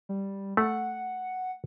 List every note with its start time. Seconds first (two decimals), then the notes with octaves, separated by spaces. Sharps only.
0.09 G3
0.57 A3 F#5